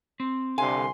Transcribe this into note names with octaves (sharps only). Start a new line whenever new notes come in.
C4
C2 D3 F5 G#5 C6